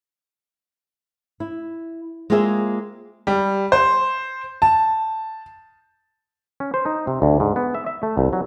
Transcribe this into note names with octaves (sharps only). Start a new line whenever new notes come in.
E4
G#3 A#3 C4 F4 G#4 E5
G3
C5
A5
C#4
C5
D#4
C3
D2
G#2
B3
E5
E5
A3
C2
F#3